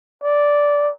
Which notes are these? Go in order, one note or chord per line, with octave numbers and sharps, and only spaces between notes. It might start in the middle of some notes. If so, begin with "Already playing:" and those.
D5